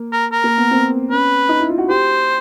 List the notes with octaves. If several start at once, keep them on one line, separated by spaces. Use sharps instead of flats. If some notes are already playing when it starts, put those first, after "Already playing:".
Already playing: A#3
A#4
A#4
A#3
B3
C4
C#4 B4
D#4
E4
F4
F#4
G4 C5